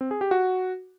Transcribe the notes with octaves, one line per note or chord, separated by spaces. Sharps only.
C4
G#4
G4
F#4